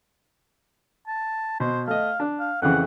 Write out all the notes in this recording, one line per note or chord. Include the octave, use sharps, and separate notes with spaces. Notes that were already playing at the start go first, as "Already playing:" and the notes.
A5
B2 C5
A3 D#5 F5
D4
F5
F2 C#3 E3 F#5